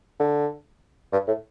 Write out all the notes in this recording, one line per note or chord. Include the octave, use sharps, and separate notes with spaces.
D3
G2
A2